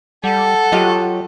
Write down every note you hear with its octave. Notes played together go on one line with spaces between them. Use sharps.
G3 A4 F#5
F#3 F4 G4 D#5